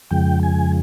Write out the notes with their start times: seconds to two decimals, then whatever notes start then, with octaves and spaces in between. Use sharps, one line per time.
0.11 F2 C#3 F3 G#3 G5
0.43 G#5